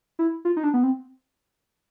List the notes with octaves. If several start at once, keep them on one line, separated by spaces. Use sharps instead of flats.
E4
F4
D#4
D4
B3
C4